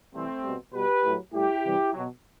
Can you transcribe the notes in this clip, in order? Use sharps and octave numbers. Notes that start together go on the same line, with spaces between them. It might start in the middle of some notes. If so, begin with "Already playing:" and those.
C3 E3 G3 A3 C4
B2 G3
B2 G3 G4 B4
A2 F#3
A2 G3 E4 G4
C3 E3 G3
B2 F#3